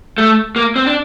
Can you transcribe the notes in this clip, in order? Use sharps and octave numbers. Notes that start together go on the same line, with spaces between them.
A3
A#3
C4
D4